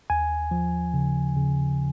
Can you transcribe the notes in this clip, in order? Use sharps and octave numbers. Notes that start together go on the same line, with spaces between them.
D#2 G#5
F3
C#3
C#3